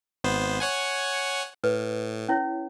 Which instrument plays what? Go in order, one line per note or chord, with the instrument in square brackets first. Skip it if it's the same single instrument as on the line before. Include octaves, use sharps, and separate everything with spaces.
[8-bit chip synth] G#1 B3 C5
C#5 F#5 G#5
[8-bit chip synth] A2 [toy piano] B4
[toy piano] C#4 E4 C#5